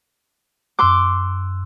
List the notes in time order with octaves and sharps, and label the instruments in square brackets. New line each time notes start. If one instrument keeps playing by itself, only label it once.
[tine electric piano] F#2 E6 F#6 [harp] C6 D6